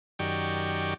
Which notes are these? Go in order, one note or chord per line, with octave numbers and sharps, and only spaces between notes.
F#2 D#3 G4 D5 C#6